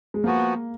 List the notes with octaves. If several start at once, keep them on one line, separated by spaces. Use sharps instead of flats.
G#3
F3 A#3 B3 F#4